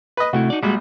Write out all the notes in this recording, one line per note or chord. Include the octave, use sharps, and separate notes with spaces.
B4 D#5
C3 A3 E4 F#4
D#4 D5
A#1 G3 G#3 F#4